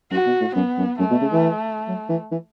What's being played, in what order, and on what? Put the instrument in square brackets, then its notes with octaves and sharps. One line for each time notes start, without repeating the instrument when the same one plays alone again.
[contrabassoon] F#2 [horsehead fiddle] F#4
[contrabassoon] B2
A2
[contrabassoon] F#2 [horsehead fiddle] B3
[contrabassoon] F#2
[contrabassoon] F#2 [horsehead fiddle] A3
[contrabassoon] B2
C#3
E3
F#3
E3
E3